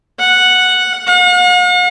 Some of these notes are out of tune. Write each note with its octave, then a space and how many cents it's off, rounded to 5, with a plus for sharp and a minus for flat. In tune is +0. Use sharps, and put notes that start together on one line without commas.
F#5 -5
F#5 -45